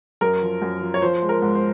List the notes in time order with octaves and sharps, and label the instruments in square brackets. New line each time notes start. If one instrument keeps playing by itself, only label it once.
[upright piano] F#2 A#4
F3
F#2
F3
C#5
F3 C5
G#3
A#4
G#2
C5